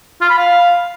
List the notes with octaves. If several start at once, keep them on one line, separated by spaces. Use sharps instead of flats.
F4
B5
F5